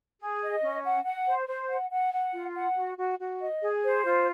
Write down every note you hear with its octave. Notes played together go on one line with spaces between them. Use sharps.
G#4
D#5
C#4
F#5
F#5
C5
C5
F#5
F#5
F#5
F4
F#5
F#4
F#4
F#4
D#5
G#4
C5
F4